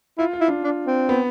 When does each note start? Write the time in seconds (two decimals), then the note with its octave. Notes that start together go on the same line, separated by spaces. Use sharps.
0.18 E4 F4
0.33 F4
0.41 E4
0.48 D4
0.64 D4
0.87 C4
1.09 B3